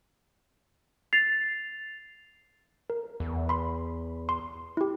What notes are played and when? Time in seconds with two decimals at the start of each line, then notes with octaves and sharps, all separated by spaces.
1.13 A6 C7 F7
2.90 A#4
3.20 E2
3.49 B5 C6
4.29 C6
4.77 E4 G4